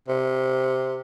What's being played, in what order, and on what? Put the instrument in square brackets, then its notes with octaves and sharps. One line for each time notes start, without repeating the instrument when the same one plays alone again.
[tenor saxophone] C3